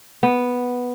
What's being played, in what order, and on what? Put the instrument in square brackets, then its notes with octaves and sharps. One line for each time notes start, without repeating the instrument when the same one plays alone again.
[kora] B3